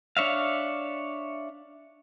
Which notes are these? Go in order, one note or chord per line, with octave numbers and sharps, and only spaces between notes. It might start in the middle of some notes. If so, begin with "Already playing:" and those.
D4 C#5 E5 F5